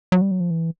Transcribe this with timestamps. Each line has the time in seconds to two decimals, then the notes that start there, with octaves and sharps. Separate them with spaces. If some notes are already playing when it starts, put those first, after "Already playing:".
0.12 F#3
0.21 G3
0.31 F#3
0.40 F3
0.51 E3